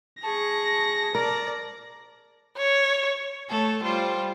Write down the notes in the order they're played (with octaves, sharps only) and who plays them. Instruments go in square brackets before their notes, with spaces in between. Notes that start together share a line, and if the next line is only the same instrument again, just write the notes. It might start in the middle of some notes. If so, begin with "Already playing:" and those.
[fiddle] G#4 C#6 [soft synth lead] A5 [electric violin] A#6
[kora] A#4 [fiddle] D5
[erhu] C#5
[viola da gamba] A3 A4 C#5
G3 F4 C5